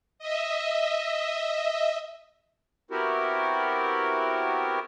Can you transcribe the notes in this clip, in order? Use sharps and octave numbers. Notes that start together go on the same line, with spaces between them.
D#5 E5
B3 C4 E4 F#4 G4 A#4